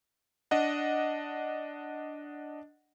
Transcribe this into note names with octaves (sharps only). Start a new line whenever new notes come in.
D4 D#5 F#5